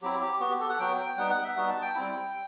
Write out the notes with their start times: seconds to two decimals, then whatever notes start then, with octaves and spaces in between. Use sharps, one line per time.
0.02 F#3 C4 E4 G4
0.21 G4
0.40 B3 F#4
0.51 G4
0.60 A4
0.69 F#5
0.79 F#3 B3 F#4 G5
0.92 G5
1.05 G5
1.17 G3 B3 D#4 F#5
1.30 F#5
1.44 E5
1.56 G3 B3 D#4 F#4 F#5
1.69 A5
1.82 G5
1.95 G3 C4 E4